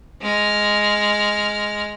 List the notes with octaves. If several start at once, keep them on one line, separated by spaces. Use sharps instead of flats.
G#3 F6